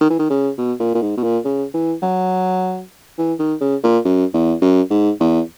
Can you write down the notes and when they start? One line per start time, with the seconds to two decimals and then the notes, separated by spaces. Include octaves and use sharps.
0.01 D#3
0.10 E3
0.19 D#3
0.30 C#3
0.58 B2
0.79 A#2
0.95 A#2
1.02 G#2
1.17 B2
1.23 A#2
1.44 C#3
1.74 E3
2.02 F#3
3.18 E3
3.39 D#3
3.61 C#3
3.83 A#2
4.05 F#2
4.34 E2
4.61 F#2
4.90 G#2
5.20 E2